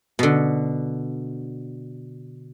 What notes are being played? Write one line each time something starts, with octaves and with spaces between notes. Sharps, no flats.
B2 D3